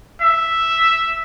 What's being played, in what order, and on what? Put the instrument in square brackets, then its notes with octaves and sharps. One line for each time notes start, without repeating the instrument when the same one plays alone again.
[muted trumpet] E5